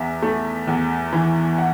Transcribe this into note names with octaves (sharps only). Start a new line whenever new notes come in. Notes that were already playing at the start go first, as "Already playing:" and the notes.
Already playing: E2 E5
A3
E2
E3
F#5